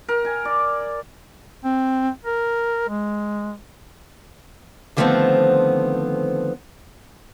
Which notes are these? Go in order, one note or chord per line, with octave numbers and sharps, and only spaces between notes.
A#4
G#5
D5
C4
A#4
G#3
D3 D#3 F3 A3 B3 C4